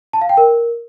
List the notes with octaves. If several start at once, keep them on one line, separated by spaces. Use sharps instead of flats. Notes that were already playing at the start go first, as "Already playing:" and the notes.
A5
F5
G5
A#4